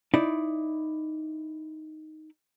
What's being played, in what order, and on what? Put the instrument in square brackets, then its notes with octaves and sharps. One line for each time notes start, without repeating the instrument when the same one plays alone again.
[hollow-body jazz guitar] D#4 E4 D5